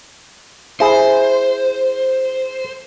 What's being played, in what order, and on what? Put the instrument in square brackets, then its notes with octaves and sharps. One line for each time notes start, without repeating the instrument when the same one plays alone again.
[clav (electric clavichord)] E4 G#4 [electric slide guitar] C5